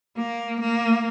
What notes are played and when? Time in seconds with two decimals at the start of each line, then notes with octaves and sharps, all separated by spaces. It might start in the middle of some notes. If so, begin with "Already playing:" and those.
0.17 A#3
0.60 A#3